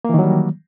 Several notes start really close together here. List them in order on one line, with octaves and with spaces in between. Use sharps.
A#3 E3 D#3 F#3 G3